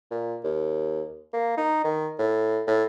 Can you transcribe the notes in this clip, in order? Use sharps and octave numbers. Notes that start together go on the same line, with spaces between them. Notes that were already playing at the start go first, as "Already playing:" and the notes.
A#2
D#2
A#3
D#4
D#3
A2
A2